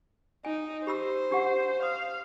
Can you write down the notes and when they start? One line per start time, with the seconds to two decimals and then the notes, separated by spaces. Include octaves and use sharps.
0.45 D#4 G#5
0.87 G4 C5 B5 E6
1.31 D4 G4 F#5
1.83 F5 D#6